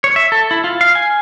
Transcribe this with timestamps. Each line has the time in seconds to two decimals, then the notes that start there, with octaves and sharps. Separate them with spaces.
0.04 C#5
0.16 E5
0.32 A4
0.51 E4
0.64 F4
0.81 F5
0.95 G#5